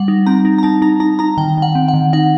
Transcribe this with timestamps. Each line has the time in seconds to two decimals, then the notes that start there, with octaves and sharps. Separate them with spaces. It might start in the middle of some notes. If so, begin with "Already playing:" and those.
Already playing: G3 F#5
0.08 D#4
0.26 C4 A#5
0.45 D#4
0.58 A#5
0.63 D#4 A5
0.82 D#4 A#5
1.00 D#4 A#5
1.19 D#4 A#5
1.37 D#3 G5
1.57 D#3
1.62 F#5
1.75 C4
1.88 F#5
1.94 D#3
2.13 D#4 F#5